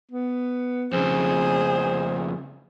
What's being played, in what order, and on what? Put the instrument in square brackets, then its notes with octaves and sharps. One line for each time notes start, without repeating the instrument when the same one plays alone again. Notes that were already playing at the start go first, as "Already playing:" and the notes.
[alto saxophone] B3
[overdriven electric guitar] F2 C#3 [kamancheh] G#4 [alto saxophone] C5